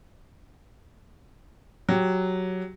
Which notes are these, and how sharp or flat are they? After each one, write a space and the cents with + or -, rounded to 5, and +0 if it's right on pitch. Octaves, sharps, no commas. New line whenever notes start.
F#3 +0 G4 +0